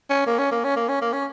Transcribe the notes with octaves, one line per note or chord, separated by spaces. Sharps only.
C#4
A#3
C#4
A#3
C#4
A#3
C#4
A#3
C#4